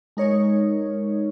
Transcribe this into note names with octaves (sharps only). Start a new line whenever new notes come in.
G#3 D#4 A#4 C#5